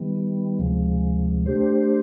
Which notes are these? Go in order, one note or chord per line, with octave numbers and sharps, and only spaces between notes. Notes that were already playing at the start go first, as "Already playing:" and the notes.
Already playing: D#3 G3 B3
D2 C3 F3 G#3
A3 D4 G4 C5